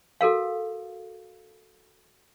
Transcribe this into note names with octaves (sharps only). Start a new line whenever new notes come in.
F#4 A4 A#4 F5